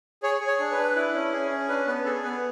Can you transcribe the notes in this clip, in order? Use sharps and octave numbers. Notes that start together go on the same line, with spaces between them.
G#4 C#5
G#4
C#5
D4
B4
D4
E4
C#4
G#4
C#4
D4 B4
B3 B4
G#4 A4
B3 B4